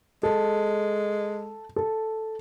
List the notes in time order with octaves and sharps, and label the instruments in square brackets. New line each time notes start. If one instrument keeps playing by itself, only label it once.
[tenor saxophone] G#3 [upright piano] A4
[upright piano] A4